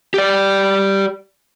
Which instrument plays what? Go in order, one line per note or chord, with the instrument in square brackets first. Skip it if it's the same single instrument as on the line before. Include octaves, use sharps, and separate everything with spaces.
[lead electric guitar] G4 D5